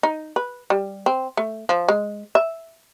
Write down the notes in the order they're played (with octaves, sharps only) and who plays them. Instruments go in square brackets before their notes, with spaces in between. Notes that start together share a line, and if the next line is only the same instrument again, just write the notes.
[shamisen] D#4
B4
G3
C4
A3
F3
G#3
E5